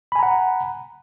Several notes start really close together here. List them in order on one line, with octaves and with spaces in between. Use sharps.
B5 G#5 A#5 F#5